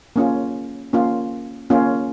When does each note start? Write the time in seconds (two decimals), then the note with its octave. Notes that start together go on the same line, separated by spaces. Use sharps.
0.16 A#3 C#4 F4
0.93 A#3 C#4 F4
1.70 A#3 C#4 F4